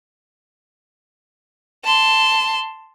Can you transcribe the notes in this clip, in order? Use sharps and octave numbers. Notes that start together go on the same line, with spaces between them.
A5 C6